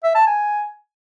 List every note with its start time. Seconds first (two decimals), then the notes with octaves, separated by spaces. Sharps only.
0.03 E5
0.15 A5
0.26 G#5